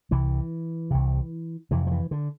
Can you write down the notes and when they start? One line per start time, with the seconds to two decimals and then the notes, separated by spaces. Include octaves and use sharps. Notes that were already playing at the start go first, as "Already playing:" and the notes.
0.11 C2 C3 E3
0.91 C2 C3
1.71 F2 C3 E3
1.87 F3
1.91 E3
2.11 D3